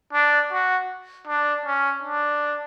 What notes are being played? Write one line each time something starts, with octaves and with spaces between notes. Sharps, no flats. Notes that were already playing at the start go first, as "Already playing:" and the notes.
D4
F#4
D4
C#4
D4